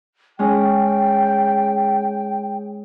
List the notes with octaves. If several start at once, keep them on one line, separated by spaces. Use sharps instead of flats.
G#3 C#4 G#4 G5